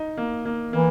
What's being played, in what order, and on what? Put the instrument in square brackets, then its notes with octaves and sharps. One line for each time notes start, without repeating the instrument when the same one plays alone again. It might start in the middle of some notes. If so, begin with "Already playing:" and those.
Already playing: [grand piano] D#4
A#3
A#3
[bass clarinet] E3 [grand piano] A#3